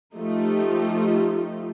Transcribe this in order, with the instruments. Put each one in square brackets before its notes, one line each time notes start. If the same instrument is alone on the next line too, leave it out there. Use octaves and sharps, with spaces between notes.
[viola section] F3 A3 D#4 F4 G4